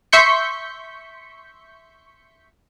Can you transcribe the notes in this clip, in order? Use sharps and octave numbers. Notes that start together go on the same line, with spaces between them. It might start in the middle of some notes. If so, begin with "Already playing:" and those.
E5 C6 C#6 G6 B6 C#7